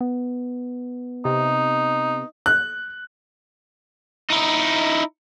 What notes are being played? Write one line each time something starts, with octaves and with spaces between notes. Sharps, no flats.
B3
C3 D#4
F#6
D#4 E4